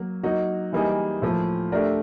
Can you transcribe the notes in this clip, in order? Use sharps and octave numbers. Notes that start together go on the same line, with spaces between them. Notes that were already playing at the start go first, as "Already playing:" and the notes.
Already playing: F#3 A#3
F#3 A#3 D#4 F#4
E3 G3 A#3 D#4 G#4
A2 F3 A#3
A3 D4 G4 A#4 D5